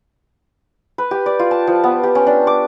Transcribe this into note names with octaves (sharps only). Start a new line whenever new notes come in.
B4
G4
D5
F4
A5
F3
B3
G4
C#4
D4
D6